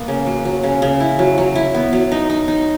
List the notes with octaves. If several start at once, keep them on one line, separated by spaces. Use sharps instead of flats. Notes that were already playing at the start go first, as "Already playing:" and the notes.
Already playing: A#3 B3
C#3
F#3
F#3
C#3
C#3
E4
F#3
F#3
E4
B3
F#3
D#4
D#4
D#4